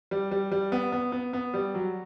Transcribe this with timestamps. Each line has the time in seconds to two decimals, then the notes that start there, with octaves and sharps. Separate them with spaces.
0.11 G3
0.31 G3
0.51 G3
0.72 B3
0.92 B3
1.12 B3
1.33 B3
1.54 G3
1.74 F#3